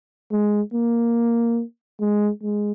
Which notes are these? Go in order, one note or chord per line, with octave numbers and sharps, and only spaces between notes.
G#3
A#3
G#3
G#3